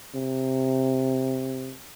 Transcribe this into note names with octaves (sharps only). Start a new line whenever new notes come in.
C3